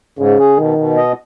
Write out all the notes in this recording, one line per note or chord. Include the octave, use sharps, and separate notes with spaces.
G#2 C#3
G#4
B2 D#3
B2
D#5